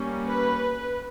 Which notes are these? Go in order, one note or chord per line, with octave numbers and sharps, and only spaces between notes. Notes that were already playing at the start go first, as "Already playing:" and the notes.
Already playing: G3 A#3 C#4
B4